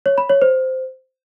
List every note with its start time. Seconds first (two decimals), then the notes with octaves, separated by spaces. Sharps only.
0.06 C#5
0.18 B5
0.30 C#5
0.42 C5